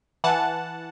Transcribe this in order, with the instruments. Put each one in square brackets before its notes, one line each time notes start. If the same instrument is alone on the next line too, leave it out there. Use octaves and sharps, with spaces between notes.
[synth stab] E3 F#5 A5